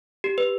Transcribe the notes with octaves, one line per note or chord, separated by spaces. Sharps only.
G4
B4